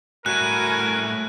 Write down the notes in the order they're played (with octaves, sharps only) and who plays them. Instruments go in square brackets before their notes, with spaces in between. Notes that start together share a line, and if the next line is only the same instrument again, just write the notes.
[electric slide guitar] A2 G3 E4 [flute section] F#4 G#5 F6 [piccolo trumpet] A#4 [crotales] F#6